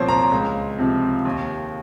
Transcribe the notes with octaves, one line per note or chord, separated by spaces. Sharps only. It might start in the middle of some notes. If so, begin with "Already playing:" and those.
Already playing: C2 A#2 F3 C4 C5 C#5
A#5
C#2
C3 F3
D#2